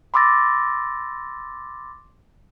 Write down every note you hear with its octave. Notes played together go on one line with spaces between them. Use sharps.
B5 C6 D6 E6 A6 A#6